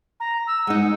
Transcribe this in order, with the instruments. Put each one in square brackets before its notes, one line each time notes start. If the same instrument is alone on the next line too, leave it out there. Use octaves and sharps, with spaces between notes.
[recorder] A#5
E6
[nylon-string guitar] G#3 D#4 [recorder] F#5